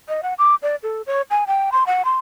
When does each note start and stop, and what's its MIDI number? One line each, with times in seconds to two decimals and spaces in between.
0.09 0.21 75
0.23 0.34 78
0.38 0.55 86
0.62 0.76 74
0.83 1.02 69
1.07 1.22 73
1.31 1.44 80
1.47 1.70 79
1.72 1.84 84
1.87 2.05 78
2.05 2.19 84